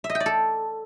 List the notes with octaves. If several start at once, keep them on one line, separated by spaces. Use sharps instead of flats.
E5
D#5
G5
D5
A4